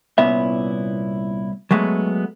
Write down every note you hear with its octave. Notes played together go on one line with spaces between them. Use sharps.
C2 A#2 B3 C#4 E4 E5
F#3 G#3 A3 B3